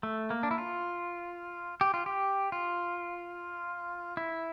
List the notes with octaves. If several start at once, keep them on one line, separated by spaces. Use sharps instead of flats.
A3
A#3
D4
E4
F4
G4
F4
G4
F4
E4